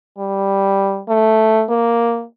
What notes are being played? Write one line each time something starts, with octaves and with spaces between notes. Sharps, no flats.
G3
A3
A#3